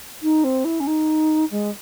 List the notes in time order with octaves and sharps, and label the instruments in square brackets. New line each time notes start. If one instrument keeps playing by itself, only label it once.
[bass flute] D#4
C4
E4
C#4
D#4
G#3